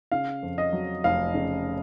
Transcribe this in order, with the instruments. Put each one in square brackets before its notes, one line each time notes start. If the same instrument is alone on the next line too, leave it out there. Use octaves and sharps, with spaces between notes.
[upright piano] C#3 F5
F2
D#5
F#3
F1 F5
C#3